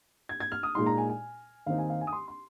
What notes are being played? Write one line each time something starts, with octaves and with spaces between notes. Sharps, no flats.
G#6
G#6
F6
D#6
A#2 G#3 D#4 C6
A#5
G#5
G#5
D#2 D#3 C4 D#4 F5
G#5
F5
G#5
D#6
C6
C6